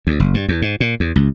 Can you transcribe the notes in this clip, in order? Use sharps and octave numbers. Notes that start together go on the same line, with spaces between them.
D2
F#1
G2
E2
G#2
A#2
E2
C#2